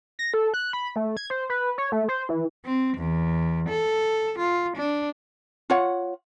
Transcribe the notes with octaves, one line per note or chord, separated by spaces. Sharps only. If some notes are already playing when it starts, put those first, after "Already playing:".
A#6
A4
F#6
B5
A3
G#6
C5
B4
C#5
A3
C5
E3
C4
E2
A4
F4
D4
F4 C#5 F#5